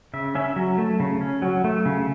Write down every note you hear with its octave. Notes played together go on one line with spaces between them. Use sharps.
C#3 E5
C#4 E5
F#3
A3
C#3
C#4
F#3
A3
C#3